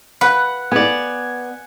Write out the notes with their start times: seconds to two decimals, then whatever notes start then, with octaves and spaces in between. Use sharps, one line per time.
0.21 B4 F#5
0.72 B3 D5 G#5